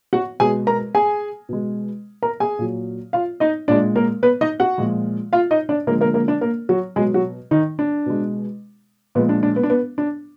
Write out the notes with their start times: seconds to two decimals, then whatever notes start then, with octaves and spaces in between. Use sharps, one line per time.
0.13 F#4 F#5
0.40 B2 G#3 G#4 G#5
0.67 A#4 A#5
0.95 G#4 G#5
1.49 B2 G#3
2.23 A#4 A#5
2.40 G#4 G#5
2.59 A#2 F#3
3.13 F4 F5
3.40 D#4 D#5
3.68 A#2 G#3 D4 D5
3.96 A#3 A#4
4.23 B3 B4
4.41 D#4 D#5
4.60 F#4 F#5
4.78 A#2 F3 G#3
5.33 F4 F5
5.51 D#4 D#5
5.69 D4 D5
5.87 D3 F3 G#3 A#3 A#4
6.01 A#3 A#4
6.14 A#3 A#4
6.28 D4 D5
6.41 A#3 A#4
6.69 F#3 F#4
6.96 B2 F#3 G#3 G#4
7.14 F#3 F#4
7.51 D#3 D#4
7.79 D4
8.06 B2 G#3
9.15 A#2 F3 G#3 B3
9.29 D4
9.43 D4
9.56 B3
9.63 D4
9.70 B3
9.98 D4